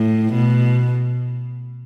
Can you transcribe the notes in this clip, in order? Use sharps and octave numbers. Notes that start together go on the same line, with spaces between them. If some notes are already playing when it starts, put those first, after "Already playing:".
Already playing: A2
B2